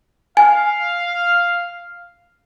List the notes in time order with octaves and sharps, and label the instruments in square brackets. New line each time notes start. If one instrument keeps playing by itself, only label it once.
[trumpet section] F5 [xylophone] G#5